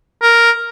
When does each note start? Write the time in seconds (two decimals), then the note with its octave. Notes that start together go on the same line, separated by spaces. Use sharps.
0.22 A#4